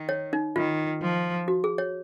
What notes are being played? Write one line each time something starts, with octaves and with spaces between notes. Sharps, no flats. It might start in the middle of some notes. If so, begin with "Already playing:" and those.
Already playing: D#3
C#5
D#4
D#3 F4
F3
F#4
G#4
C#5